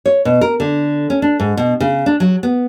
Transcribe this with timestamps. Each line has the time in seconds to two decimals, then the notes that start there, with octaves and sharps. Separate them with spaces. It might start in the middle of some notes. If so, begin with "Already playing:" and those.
0.06 C#5
0.25 B2
0.41 A#4
0.60 D3
1.10 C#4
1.22 D4
1.40 G#2
1.57 B2
1.80 C#3
2.06 D4
2.20 F#3
2.43 B3